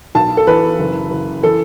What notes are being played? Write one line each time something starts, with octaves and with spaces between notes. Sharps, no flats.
B1 A5
A4
E3 B4
F#1
F#1
E3 A4